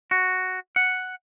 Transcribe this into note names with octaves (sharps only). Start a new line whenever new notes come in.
F#4
F#5